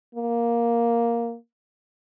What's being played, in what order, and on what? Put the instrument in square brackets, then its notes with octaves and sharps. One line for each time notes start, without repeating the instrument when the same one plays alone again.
[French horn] A#3